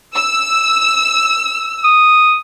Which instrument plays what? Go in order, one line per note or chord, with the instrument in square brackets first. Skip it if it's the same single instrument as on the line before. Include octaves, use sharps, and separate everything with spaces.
[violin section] E6
[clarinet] D#6